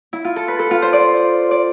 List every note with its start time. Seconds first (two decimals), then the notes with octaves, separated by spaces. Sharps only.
0.13 E4
0.24 F4
0.36 A4
0.48 B4
0.59 A4
0.71 F4
0.82 C5
0.93 D5
1.51 D5